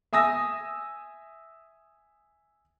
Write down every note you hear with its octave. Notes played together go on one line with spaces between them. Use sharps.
E5 G#5 D#6 E6 A#6